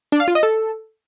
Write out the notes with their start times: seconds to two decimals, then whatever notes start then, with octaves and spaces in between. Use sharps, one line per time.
0.12 D4
0.20 F5
0.28 F4
0.35 D#5
0.43 A4